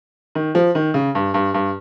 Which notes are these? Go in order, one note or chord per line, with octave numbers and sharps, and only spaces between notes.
D#3
F3
D#3
C#3
G2
G2
G2